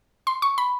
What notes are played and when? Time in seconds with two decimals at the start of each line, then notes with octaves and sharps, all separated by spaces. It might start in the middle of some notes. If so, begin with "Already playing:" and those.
0.27 C6
0.42 C#6
0.58 B5